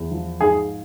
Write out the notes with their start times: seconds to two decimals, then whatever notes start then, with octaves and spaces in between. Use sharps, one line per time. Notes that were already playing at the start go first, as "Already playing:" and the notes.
Already playing: E2
0.11 F3
0.40 G#2 G#4